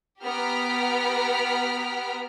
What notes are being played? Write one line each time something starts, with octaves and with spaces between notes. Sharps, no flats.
B3 G4 A#5 F6 B6 D7